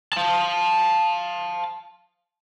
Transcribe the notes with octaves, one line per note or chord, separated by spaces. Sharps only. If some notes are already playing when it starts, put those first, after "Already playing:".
F5 A5